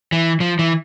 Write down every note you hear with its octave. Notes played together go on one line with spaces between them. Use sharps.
E3
F3
E3